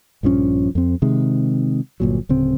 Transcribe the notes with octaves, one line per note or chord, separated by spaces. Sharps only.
A#1 G2 F3 C#4
F2 C4
C3 D#3 G#3
G1 A#2 F#3
D1 C#3 C4